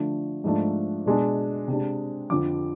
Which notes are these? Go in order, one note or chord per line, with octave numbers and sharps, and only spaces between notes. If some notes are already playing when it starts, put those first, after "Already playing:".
Already playing: D3 F3 A3 D4
G#2 F3 A3 D4
B2 G#3 D4
C3 G#3 D4
F2 D3 F3 D6